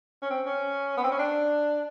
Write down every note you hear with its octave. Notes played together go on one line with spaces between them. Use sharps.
C#4
C4
C#4
B3
C4
C#4
D4